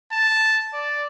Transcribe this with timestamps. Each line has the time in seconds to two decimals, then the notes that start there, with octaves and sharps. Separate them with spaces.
0.12 A5
0.74 D5